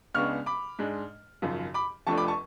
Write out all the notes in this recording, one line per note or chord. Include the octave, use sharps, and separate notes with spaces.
C#2 C#3 G#3 B3 D4 C#6 F6
B5 D6
G#2 G#3 D4
G#1 F#2 C#3 F3
B5 D6
F1 F2 F3 A3 D4 A5 C#6
B5 D6
A5 C#6